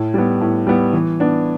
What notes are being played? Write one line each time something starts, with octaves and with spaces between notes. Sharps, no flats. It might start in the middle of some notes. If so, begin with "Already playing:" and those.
Already playing: A2
G3 B3
A2
G3 B3
E3
B3 D4